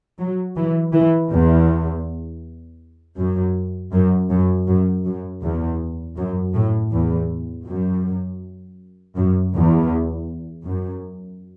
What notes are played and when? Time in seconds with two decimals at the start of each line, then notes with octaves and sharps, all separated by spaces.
0.18 F#3
0.56 E3
0.93 E3
1.31 E2
3.17 F#2
3.93 F#2
4.30 F#2
4.68 F#2
5.05 F#2
5.42 E2
6.17 F#2
6.54 A2
6.92 E2
7.66 F#2
9.16 F#2
9.54 E2
10.66 F#2